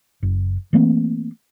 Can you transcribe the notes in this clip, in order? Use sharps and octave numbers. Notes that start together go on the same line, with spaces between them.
F#1
E3 A3 A#3 C4